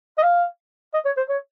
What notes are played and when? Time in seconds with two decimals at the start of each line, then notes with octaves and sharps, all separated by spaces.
0.18 D#5
0.23 F5
0.94 D#5
1.05 C#5
1.17 C5
1.29 C#5